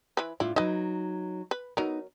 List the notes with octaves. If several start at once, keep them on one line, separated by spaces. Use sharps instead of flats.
E3 B4
A2 D4 E4 F4
F#3 D#4 B4 D#5
B4
F#3 B3 D#4 A#4